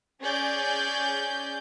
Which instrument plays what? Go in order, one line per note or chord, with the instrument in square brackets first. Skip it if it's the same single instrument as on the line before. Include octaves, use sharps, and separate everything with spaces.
[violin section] C#4 G#4 D5 G6